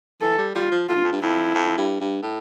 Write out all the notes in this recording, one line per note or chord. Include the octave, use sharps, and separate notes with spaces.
E3 A4
G3
G3 F4
F3
A2 F4
G2
F2
G2
F2 E4
F2
G2
G2
A2